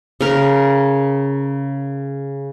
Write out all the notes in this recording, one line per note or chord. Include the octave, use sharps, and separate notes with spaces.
C#3 A#4